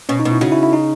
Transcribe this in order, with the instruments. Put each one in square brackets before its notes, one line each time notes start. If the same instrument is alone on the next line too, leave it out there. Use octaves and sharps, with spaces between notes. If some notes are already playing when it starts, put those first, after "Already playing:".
[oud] B2 [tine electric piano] C#4
[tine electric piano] D#4
[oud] B2
[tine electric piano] E4
[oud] C#3 [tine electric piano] F#4
[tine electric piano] E4
E4
D#4